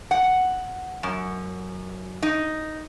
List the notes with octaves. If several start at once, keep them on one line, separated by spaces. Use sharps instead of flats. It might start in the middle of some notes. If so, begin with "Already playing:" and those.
F#5
F#2
D#4